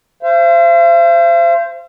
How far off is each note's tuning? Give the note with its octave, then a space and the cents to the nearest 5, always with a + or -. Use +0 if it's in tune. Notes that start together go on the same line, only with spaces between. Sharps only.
C5 +0 F5 -45